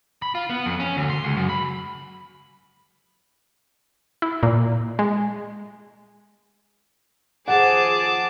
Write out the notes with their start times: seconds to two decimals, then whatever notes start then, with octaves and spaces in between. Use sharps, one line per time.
0.22 B5
0.35 F4
0.50 B3
0.65 F2
0.80 C#4
0.97 D2
1.10 C6
1.24 C#2
1.36 F#2
1.49 B5
4.22 E4
4.43 A#2
4.99 G#3
7.48 D#2 F3 G#4 F#5 A5 D6